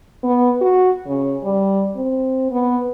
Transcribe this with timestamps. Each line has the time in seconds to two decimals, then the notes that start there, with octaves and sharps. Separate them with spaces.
0.23 B3
0.61 F#4
1.07 C#3
1.44 G3
1.96 C4
2.51 B3